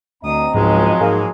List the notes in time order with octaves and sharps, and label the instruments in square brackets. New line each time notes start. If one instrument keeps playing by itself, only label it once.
[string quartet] D2 D#6 [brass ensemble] C4 D#5 A#5
[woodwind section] C#2 [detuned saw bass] G#2 [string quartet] F3 F#3 G#3
[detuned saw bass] G#2 [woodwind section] A#3 G#4